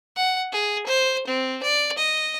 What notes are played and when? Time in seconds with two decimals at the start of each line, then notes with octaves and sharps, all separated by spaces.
0.16 F#5
0.52 G#4
0.87 C5
1.27 C4
1.63 D5
1.98 D#5